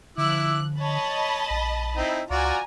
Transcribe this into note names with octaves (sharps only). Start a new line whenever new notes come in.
D3 F3 E4 D6 E6 F#6
C#5 D#5 A5 B5
A#1
C4 D#4 E4
C#2 F4 F#4 D5 G#5 A#5